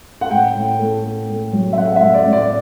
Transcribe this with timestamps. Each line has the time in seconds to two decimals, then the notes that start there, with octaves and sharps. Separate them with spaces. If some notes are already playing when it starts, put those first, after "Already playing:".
0.21 F#5
0.31 A2 G5
0.56 A2
0.79 A3
1.04 A3
1.29 A3
1.53 F#3
1.73 E5
1.78 A3 F#5
1.96 E5
2.02 A2
2.14 D5
2.26 A2
2.33 D5